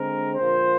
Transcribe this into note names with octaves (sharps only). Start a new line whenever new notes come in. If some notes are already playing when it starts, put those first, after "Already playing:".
Already playing: D3 G#3 C4 A#4
A#2 F3 A#3 C5